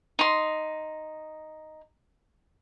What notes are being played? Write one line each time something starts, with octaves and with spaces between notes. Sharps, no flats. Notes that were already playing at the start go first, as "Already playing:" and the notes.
D#4 C6